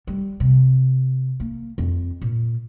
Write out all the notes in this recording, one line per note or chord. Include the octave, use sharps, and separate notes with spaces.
G3
C3
A#3
F2
A#2